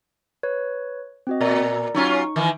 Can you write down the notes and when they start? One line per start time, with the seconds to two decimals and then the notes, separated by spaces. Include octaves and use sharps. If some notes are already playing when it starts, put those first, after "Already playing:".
0.43 B4 C#5
1.27 C4 F#4 D#5
1.41 A#2 A#4 D5 A#5
1.94 F#3 C#4 D#4 F4 C#6
2.36 D#3 E3